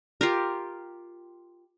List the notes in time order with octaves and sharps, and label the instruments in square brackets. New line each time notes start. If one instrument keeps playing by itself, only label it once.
[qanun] F4 G4 A#4